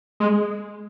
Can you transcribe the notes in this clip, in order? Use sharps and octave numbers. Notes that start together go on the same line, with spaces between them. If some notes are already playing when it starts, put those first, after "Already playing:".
G#3